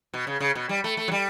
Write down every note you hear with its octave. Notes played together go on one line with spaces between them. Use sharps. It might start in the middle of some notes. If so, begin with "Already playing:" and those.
B2
C#3
C#3
B2
G3
A3
A3
F#3
G3